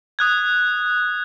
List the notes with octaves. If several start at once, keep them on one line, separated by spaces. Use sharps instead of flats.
D#6 F#6 G#6